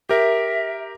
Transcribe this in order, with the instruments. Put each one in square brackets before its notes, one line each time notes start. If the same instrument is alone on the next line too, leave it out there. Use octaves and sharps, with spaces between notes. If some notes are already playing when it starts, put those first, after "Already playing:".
[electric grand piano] G4 A#4 [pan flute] E5